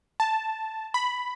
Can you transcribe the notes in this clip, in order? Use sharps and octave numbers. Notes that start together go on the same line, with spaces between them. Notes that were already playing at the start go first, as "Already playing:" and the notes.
A5
B5